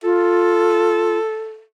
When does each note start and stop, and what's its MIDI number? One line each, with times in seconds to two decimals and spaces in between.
0.03 1.18 65
0.03 1.62 69